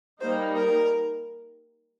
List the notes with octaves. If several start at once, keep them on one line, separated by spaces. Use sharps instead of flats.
G3 A#3 D#4 C5
A#4